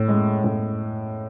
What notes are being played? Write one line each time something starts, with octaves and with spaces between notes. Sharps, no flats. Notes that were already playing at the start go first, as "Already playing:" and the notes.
Already playing: A2
G#3
A2